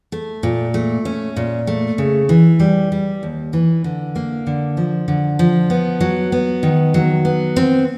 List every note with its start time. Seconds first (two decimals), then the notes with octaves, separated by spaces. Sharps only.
0.12 A3
0.43 A#2
0.74 A3
1.05 C#4
1.36 A#2
1.67 A3
1.98 C#3
2.29 E3
2.60 G3
2.92 G3
3.23 D#2
3.53 E3
3.84 D3
4.16 A#3
4.47 D3
4.77 F3
5.08 D3
5.39 F3
5.70 B3
6.01 F#3
6.32 B3
6.63 D#3
6.94 F#3
7.25 B3
7.56 C4